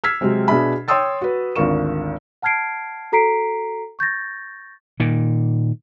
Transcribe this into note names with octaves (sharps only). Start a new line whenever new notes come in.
E6 F6 G#6 B6 C7
C3 F#3 G#3 C4
B2 D4 G#4 E5 B5
C#5 G5 C6 D#6 E6 A6
F#4 B4
G#1 D2 F4 A#4 C#6 E7
F#5 A5 F6 G#6 C7 D7
F#4 A4 A#5 B6 C7 D7
C#6 G6 A6 A#6
A#2 D#3